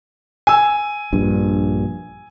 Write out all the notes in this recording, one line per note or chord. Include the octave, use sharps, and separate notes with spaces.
G#5 E6
A#1 G2